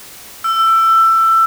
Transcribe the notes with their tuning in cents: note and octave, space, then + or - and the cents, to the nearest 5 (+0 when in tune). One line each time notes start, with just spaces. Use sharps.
E6 +20